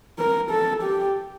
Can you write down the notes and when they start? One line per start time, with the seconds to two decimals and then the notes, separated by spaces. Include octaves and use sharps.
0.19 A#4
0.51 A4
0.83 G4